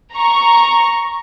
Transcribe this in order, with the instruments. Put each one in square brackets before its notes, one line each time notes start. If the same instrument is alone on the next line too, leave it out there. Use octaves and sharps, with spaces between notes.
[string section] A#5 C#6